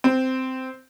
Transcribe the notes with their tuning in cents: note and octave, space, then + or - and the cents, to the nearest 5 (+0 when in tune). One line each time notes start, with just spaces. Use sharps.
C4 -10